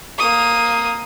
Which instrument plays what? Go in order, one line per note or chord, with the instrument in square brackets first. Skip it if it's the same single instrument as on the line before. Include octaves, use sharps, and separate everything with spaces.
[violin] A#3 D#6